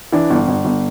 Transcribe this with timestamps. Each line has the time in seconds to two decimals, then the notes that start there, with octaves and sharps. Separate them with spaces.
0.12 E3 D4
0.30 G1
0.48 G1
0.65 G1